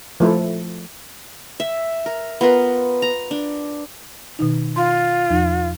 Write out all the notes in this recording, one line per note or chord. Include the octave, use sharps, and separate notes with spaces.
F3 A3 E4 A4
E5
A#4
B3 F4 A#4 B4
A#5
D4
B2 D#3 D#4
F4 C6
E2 F3 D#4